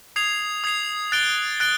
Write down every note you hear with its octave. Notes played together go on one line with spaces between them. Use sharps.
D#6 G#6 C7 F7
D#6 G#6 C7 F7
F#6 A6 D7 G7
F#6 A6 D7 G7